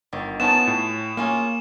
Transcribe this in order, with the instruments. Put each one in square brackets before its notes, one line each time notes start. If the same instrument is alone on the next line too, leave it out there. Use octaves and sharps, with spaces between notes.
[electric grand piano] G1 [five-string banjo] D#3
[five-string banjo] F3 C#4 F4 [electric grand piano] B3 D#4 A5 [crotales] E7
[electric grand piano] A2
[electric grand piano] A#3 [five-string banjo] C#4 F4 G#4